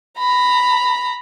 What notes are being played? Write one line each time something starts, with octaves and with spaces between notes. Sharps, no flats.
A#5 B5